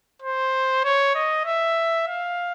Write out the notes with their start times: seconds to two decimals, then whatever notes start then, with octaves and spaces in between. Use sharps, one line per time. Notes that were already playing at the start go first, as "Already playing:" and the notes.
0.22 C5
0.84 C#5
1.15 D#5
1.45 E5
2.08 F5